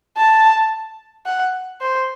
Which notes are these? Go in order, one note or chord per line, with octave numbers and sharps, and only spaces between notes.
A5
F#5
C5